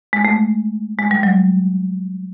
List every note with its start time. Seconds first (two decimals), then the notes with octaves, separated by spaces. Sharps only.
0.13 G#3
0.25 A3
0.99 G#3
1.11 G3
1.23 F#3